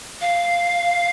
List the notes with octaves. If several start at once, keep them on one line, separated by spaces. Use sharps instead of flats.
F5